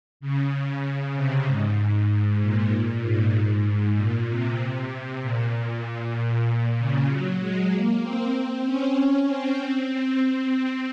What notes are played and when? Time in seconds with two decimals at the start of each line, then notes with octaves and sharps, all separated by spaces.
0.20 C#3
0.83 C#3
1.15 C3
1.46 G#2
2.40 A#2
2.71 A#2
3.02 G#2
3.96 A#2
4.28 C3
4.58 C3
5.22 A#2
5.52 A#2
6.77 C#3
7.08 F#3
7.40 G#3
7.71 A#3
8.02 C4
8.33 C4
8.65 C#4
9.27 C4
10.21 C4
10.52 C4